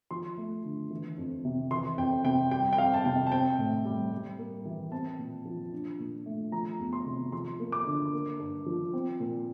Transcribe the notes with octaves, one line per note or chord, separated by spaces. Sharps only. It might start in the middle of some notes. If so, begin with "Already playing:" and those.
F3 C6
A3
D3
E3
F2
C3
E3 C6
F2 G5
C3 G5
G3 G5
G5
F2 F5
A5
C3 G5
A5
C4 G5
A2
G3
G3
A#3
E3
C4 A5
A#2
F3
D4
A#2
A3
F3 A#5
E2
C6
C3
F3 C6
A#3
D6
D3
A#3
G2
F3
C4
A#2